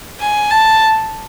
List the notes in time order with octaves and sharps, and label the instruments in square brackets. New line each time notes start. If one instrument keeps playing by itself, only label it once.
[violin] G#5
A5